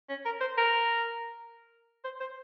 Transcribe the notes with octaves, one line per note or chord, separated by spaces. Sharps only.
C#4
A#4
C5
A#4
C5
C5